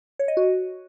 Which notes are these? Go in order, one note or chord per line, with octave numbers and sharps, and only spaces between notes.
C#5
D#5
F#4